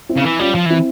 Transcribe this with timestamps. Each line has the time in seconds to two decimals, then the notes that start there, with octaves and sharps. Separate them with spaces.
0.09 C4 E4
0.17 C#3
0.24 E3
0.39 G3 C#4 F4
0.55 F3
0.66 E3 C4 E4